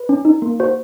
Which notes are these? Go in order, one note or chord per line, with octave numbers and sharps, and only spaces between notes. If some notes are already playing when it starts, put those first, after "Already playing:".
Already playing: B4
C#4
D#4
A#3
F#4 C5